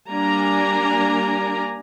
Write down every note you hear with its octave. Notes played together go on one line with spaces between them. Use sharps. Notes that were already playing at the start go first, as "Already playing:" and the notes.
G3 A#3 D4 D5 G#5 A#5